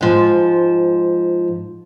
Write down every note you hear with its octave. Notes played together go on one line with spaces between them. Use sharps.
G#2 F3